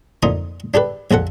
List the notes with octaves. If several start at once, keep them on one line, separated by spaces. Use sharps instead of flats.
F2 A#2 D#4 D#6
D4 G4 A4 B4
A#1 F2 A4 F#5